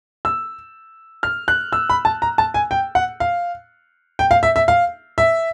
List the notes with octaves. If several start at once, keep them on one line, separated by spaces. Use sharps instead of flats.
E6
F6
F#6
E6
B5
A5
A#5
A5
G#5
G5
F#5
F5
G5
F5
E5
E5
F5
E5